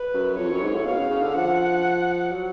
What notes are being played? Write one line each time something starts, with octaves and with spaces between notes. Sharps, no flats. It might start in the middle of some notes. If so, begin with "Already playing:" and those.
Already playing: B4
F#2
F2 C#5
F#2
G#2
A2
B2 F5
C#3
C#3
D3
F3 F#5
F#3